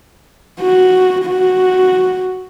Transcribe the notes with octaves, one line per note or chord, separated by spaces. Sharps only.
F#4
F#4